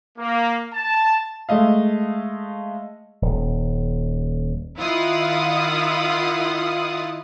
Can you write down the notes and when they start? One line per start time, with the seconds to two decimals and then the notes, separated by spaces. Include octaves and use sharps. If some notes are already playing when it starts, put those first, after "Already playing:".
0.19 A#3
0.74 A5
1.49 G#3 A3 D#5 F5
3.22 D#1
4.78 D#3 E4 F4 F5 F#5 D#6